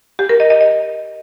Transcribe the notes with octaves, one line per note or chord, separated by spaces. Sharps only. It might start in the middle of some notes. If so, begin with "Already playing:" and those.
G4
A#4
D#5
D#5
D#5